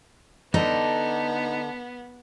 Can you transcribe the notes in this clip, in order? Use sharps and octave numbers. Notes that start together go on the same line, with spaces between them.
D3 B3 D4 D#4 A4